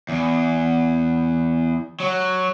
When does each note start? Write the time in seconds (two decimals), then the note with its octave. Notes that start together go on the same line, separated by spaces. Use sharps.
0.09 E2
2.00 F#3